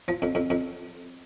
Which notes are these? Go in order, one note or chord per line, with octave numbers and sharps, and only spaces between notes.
F3
F2
F2
F2